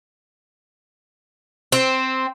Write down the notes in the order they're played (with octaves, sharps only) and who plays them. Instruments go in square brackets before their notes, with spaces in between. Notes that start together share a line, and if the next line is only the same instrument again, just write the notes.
[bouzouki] C4